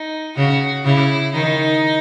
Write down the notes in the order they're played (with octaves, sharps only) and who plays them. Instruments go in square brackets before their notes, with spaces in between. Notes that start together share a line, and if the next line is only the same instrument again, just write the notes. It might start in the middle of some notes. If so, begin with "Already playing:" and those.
Already playing: [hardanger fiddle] D#4
[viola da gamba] C#3 [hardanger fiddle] F#4
[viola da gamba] C#3 [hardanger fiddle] E4
[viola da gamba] D#3 [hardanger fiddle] D#4